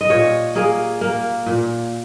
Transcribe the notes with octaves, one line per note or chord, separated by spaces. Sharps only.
D#5
A#2 C#5
A#3 G#4
A#3
A#2